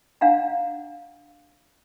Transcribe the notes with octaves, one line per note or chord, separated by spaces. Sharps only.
D4 F5 F#5 A#5